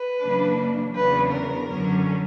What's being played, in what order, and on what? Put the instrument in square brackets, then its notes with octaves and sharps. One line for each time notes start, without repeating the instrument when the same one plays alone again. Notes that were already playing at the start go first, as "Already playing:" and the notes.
Already playing: [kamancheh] B4
[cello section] F#2 C#3 E3 A#3 D4
[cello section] E2 C#3 F#3 B3 D4 [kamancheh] B4
[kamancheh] A#4
[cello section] F#2 D3 F#3 C#4